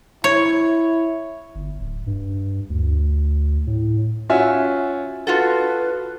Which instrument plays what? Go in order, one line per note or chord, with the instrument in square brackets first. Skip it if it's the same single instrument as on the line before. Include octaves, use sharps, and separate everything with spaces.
[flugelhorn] E4 [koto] C#5
[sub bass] G1
D1
G2
D2
A2
[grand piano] C#4 F4 F#4 E5 G#5
[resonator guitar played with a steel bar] F4 F#4 A4 [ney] B4